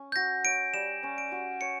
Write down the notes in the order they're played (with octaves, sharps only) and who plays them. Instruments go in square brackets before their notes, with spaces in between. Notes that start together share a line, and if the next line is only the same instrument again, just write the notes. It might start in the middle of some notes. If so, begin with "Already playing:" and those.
Already playing: [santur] C#4
[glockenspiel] G6
[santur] F#4 [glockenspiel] A#6
[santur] C#5 [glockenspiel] D7
[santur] G3 [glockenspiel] E7
[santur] C#4
[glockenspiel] D7
[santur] F#4
[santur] C#5 [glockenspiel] C#7